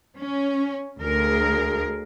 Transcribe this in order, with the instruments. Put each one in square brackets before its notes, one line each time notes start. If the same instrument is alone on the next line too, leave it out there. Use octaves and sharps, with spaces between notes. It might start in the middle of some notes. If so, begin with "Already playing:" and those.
[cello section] C#4
D2 G#4 A#4